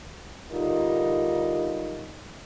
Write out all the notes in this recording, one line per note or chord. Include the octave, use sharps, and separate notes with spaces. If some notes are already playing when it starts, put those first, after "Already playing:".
D3 G3 D#4 F4 A#4